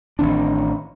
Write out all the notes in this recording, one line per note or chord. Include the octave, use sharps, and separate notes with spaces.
A1 D#3 C4 D4